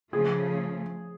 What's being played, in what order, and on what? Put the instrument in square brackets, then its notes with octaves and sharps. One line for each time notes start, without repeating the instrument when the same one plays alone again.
[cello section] C#3 F3 A3 [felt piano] G#4